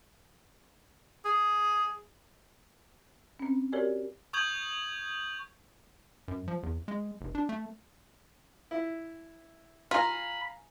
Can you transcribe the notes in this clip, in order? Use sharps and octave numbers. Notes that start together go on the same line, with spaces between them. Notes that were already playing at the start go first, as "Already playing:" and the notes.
G#4
C4 C#4
F#4 G4 A#4 C#5 D5 G#5
C#6 D#6 G6 G#6 F#7
F#2
F3
E2
G#3
F1
D4
A3
E4
F4 F5 G#5 A#5 B5